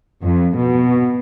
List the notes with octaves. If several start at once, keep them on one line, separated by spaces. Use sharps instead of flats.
F2
B2